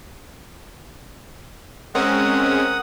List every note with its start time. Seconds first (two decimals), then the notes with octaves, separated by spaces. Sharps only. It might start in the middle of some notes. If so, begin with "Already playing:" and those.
1.95 G#3 C4 C#4 A#4 F#5 D#6